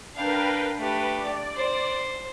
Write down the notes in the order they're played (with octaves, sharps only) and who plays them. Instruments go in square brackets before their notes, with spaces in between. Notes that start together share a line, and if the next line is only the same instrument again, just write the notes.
[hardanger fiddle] D4 F5 [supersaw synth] A#4 B4 G5
[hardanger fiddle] A3 G4 [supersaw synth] B4
[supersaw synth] D5
[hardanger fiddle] C5